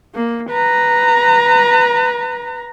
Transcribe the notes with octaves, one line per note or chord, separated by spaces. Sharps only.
A#3
B4 A#5